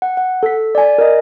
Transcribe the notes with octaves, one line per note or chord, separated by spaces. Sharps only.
F#5
F#5
A4 B6
D5 G#5
A#4 D#5